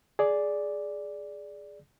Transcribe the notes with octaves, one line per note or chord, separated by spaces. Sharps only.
G#4 D5